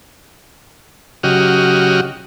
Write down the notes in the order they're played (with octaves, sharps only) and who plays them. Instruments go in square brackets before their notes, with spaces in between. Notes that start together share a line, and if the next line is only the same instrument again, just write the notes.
[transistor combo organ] C#3 F#3 F#4 G4 D#5 F6